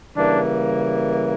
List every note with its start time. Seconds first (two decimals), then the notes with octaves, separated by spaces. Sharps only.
0.16 C#3 E3 G3 A#3 D4